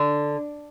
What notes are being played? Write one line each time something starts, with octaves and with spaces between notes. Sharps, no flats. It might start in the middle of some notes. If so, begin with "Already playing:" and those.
Already playing: D3